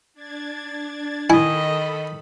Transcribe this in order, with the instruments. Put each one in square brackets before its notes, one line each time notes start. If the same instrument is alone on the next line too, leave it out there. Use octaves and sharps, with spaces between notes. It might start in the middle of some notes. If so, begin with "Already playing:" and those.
[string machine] D4 G#6 A6
[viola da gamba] D#3 D#5 [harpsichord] E4 [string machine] A4 B5 [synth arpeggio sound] G#5